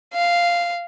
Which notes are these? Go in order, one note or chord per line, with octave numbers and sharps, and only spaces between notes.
F5